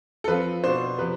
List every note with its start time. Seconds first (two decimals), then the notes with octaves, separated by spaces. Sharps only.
0.24 A4
0.28 F3 C4 F4 B4
0.63 B2 B3 D4 C5
0.99 C3 F3 B4